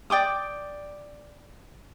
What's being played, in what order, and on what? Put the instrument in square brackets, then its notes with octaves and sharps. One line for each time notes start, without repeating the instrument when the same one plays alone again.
[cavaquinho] D5 G5 D6 D#6